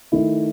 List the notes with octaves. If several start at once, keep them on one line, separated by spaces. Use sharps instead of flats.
D#3 A3 E4